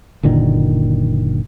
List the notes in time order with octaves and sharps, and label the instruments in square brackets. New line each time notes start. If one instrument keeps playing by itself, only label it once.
[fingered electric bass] F#1 A#2 D3 D#3